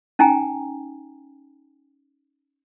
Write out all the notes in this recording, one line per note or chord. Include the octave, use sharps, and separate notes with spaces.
C#4 D#4 G5 G#5 A#5